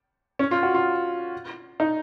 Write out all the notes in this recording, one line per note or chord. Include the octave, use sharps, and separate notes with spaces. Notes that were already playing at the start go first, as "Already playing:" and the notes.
C#4
F4
F#4
F4
D#4